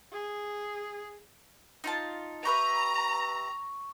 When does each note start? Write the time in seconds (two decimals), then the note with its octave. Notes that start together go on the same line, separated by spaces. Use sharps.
0.12 G#4
1.84 D#4 F4 A5
2.45 G4 B4 E5 A#5 C#6